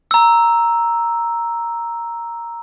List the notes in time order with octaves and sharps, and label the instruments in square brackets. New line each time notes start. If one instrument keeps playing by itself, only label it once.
[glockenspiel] A#5 E6